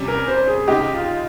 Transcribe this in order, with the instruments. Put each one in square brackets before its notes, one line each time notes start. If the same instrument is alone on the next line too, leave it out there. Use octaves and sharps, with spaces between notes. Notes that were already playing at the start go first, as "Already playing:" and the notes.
Already playing: [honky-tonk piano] C3 G3 C#4
[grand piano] A#4
C5
G#4
[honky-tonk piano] C#3 G#3 D#4 [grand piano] G4
[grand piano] F4